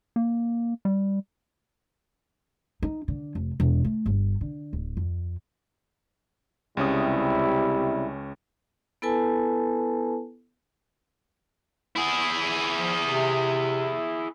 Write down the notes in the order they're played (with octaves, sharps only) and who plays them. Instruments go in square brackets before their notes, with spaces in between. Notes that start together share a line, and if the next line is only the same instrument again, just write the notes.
[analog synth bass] A#3
G3
[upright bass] D#4
D3
F1
E1
A3
G1
D3
D1
F2
[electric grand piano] C#2 C#4 D#6 [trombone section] C3 G3 E4
[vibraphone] B3 E4 A4 B4 G#5 A5
[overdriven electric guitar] E4 G#4
[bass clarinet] F3
C3